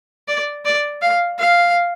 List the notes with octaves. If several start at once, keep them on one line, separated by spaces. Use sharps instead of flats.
D5
D5
F5
F5